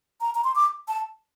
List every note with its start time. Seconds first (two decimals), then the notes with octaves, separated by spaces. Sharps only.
0.21 A#5
0.35 A#5
0.44 C6
0.55 D6
0.88 A5